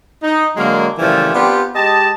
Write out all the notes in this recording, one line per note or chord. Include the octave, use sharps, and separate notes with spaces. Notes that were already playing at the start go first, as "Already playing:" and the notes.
D#4
D3 F#3 G#3 A#3
A#2 C#3 E3 F3 G3 A3
B3 C4 D4 F4 G4
G#3 G4 D#5 A5